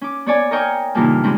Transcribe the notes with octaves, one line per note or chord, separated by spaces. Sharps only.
C#4 D6
B3 C#5 D5 G#5
A#4 C#5 D#5 G5 G#5 C#6
G2 A#2 C#3 E3 D#4
E3 G3 G#3 C4 C#4 E4